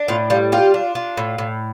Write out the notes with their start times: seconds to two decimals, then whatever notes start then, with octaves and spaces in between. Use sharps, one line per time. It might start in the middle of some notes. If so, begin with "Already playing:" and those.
Already playing: D4
0.08 A2 F4
0.30 G3 F4
0.52 F4 G4
0.74 D4
0.95 F4
1.17 A2
1.38 A2